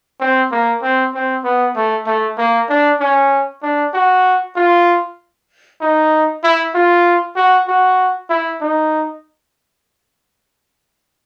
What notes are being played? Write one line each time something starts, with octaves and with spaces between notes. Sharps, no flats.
C4
A#3
C4
C4
B3
A3
A3
A#3
D4
C#4
D4
F#4
F4
D#4
E4
F4
F#4
F#4
E4
D#4